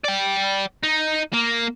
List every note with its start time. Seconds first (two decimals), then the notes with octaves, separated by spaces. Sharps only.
0.05 D5 G5
0.83 D#4
1.34 A#3